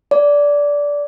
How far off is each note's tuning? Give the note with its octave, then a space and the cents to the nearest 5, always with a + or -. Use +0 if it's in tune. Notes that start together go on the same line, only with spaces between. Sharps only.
D5 -15